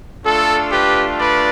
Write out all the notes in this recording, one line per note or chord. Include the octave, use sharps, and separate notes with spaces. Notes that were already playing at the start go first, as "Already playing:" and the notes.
A3 D4 F4 A4
G4 B4
B4 D5